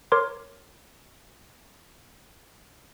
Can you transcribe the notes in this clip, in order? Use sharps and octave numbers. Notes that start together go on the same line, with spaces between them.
A#4 C#5 C6 D6